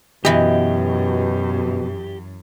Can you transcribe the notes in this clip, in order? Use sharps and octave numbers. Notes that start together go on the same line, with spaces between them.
F#2 B2 E3 G4 D#5